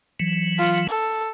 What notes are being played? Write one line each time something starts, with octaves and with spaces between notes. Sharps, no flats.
E3 F#3
F4
A4